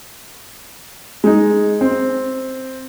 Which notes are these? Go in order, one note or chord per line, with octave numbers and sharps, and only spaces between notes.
G#3 D#4
C4